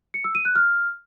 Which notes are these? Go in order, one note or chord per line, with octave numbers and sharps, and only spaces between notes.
C#7
E6
D#7
F#6
F6